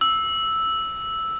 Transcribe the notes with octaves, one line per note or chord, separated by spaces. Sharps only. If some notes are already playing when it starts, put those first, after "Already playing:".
E6